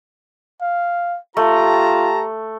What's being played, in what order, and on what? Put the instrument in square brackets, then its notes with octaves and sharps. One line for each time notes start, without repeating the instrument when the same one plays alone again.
[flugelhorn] F5
[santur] A3 [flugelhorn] F4 [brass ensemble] G4 A5 A#5